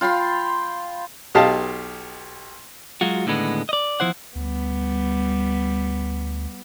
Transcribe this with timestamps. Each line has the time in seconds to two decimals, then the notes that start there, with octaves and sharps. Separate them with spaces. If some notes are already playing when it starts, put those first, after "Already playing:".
0.01 F4 G5 B5 C6
1.35 B1 G4 D#5 F5 A5
3.01 F#3 G#3 F4 F#4
3.26 D#2 A2 D3 G#3 B3
3.69 D5 D#5
4.00 E2 F3 E4 C5 F#5
4.35 D2 G3 B3